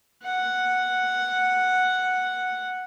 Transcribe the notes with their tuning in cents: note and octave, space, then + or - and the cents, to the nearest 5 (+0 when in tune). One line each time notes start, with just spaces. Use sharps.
F#5 +0